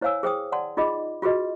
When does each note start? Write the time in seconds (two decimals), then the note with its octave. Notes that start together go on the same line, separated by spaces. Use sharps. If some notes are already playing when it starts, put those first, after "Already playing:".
0.01 E4 C5 C#5 F5 G#5 E6
0.23 G#4 C5 G5 D#6
0.52 D5 F#5 A5 C6
0.77 D#4 F4 G#4 D#5 B5 D6
1.22 F4 F#4 G#4 B4 D#5